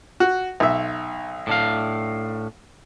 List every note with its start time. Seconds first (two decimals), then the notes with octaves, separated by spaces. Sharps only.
0.20 F#4
0.60 B1 E5
1.47 A2 D4 F5